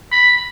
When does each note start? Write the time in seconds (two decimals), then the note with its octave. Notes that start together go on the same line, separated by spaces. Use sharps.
0.12 B5